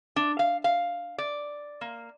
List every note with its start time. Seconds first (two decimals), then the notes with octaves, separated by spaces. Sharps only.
0.16 D4
0.39 F5
0.64 F5
1.18 D5
1.81 A#3